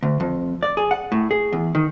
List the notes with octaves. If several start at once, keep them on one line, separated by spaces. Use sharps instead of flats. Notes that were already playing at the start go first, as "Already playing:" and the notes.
D2
F2
D5
G#4
F#5
A2
G#4
E2
D#3